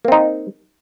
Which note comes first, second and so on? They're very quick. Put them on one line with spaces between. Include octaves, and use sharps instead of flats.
A#3 C4 D#4